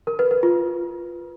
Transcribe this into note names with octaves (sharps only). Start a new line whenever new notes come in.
A#4
B4
B4
F4